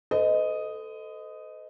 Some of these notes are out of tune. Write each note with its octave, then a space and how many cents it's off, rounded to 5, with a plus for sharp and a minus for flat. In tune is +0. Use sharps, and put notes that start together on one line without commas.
A4 +0 C5 -45 D#5 +0